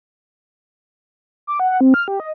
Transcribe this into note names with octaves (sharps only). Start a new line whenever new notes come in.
D6
F#5
C4
F6
G4
D#5